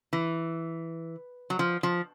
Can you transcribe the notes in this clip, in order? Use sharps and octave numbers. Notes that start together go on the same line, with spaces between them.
E3
F#3
F3
F3